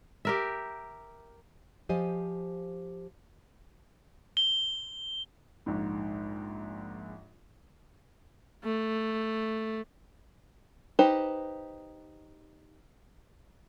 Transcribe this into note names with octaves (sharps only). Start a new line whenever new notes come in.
G4 A#4 E5
F3 G4 C5 D#5 F5 G#5
G7
A#1 G#2
A3
D#4 G4 B4 C5